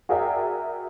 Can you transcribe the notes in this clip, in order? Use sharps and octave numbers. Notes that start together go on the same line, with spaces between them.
F#4 G#4 A#4 D5 E5 G5